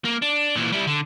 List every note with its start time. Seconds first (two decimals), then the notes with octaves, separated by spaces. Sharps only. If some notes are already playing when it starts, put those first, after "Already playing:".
0.05 A#3
0.22 D4
0.56 A#2 E3
0.72 G3 E4
0.87 D3